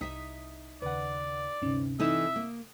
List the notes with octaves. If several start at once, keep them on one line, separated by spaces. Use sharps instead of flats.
C2 D#4 E5 D#6 B6
D#2 C#3 B4 D5 F#5
D2 G2 C3 C#4 D#4
E3 C4 D#4 E4 A4 E5 D#6 E7
A#3